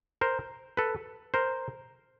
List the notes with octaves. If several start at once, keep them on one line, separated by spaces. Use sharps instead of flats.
A#4 C5
A4 B4
A#4 C5